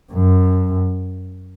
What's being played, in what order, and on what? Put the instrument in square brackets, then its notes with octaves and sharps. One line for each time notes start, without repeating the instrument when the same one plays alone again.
[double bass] F#2